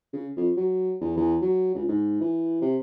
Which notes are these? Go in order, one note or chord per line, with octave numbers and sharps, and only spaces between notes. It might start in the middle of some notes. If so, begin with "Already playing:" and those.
C#3
F2
F#3
E2
E2
F#3
C#2
G#2
E3
C3